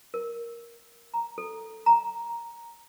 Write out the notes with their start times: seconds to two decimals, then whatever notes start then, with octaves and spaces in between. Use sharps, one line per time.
0.14 A#4
1.14 A#5
1.38 A4
1.86 A#5